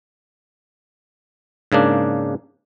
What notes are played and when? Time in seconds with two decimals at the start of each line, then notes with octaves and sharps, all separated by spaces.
1.72 G#2 C#3 A#3 D4